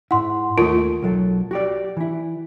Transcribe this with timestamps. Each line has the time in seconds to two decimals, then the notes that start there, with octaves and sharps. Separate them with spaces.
0.11 G#2 E4 F#5 C6
0.58 D#2 A3 F4 A#4
1.02 B1 F#3 A4
1.51 F#4 G4 D5
1.97 E3 E4